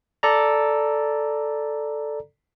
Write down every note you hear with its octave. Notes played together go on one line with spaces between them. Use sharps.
A4 D5 A#5